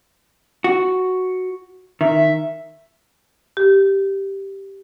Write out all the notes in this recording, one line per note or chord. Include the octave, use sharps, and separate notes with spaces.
F#4
D#3 E5
G4